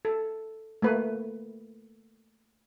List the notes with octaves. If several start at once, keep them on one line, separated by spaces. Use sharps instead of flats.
A4
A3 A#3 B4